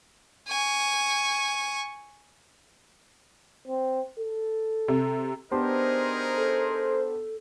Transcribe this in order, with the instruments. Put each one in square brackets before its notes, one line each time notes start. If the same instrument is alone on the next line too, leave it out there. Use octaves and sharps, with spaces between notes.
[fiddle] G#5 C#6
[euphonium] C4
A4
[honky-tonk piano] C3
[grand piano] B3 D4 G4 [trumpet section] D#4 G#4 A#4 [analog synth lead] C5
[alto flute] A4